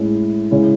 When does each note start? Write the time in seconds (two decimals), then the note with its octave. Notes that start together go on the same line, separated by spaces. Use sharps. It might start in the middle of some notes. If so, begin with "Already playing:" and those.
Already playing: A2 G#3 C#4 E4
0.51 C#3 G#3 C#4 E4